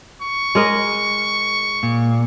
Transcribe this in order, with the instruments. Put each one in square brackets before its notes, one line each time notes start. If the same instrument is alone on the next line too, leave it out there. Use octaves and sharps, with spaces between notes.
[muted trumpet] C#6
[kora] G#3 A#4 D#5
[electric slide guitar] A#2